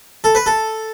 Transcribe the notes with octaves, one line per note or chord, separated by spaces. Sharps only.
A4
B4
A4